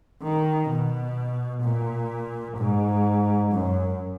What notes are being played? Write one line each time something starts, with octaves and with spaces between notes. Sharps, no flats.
D#3
B2
A#2
G#2
F#2